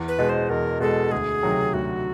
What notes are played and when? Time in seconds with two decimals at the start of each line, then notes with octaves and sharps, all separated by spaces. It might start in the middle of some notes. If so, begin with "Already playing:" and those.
Already playing: E2
0.08 B4
0.19 B2 G#3
0.29 C5
0.49 E2 A#4
0.80 B2 G#3 A4
1.11 D2 G#4
1.43 C3 D#3 F#3
1.74 D2 F#4